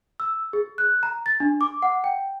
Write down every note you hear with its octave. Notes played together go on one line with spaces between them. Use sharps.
E6
G#4
F#6
A#5
A6
D4
D6
F#5
G5